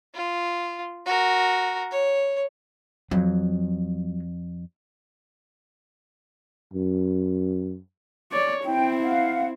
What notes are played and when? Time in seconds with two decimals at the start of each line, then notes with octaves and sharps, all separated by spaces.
0.14 F4
1.06 F#4 A#4
1.91 C#5
3.11 F2 F#3
6.73 F#2
8.32 C#5 D5
8.65 C4 E4 G5
9.02 F5 F#5